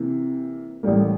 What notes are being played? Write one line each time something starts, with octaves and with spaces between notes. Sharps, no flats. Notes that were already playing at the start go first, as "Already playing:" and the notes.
Already playing: C3 E3 A#3
A1 A2 G3 A#3